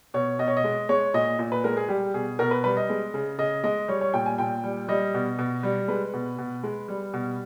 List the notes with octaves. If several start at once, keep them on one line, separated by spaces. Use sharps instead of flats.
B2 C#5
B2 D#5
C#5
D#5
G#3
G#3 C#5
A#2 D#5
A#2
B4
G#3 A#4
G#4
G3 G4
B2 G#4
B2 A#4
B4
G3 B4
D#5
G#3
C#3
C#3 D#5
G#3 D#5
G3 C#5
C#5
A#2 G5
G#5
A#2 G5
G3
G3 D#5
B2
B2
G3
G#3 B4
B2
B2
G#3
G3
B2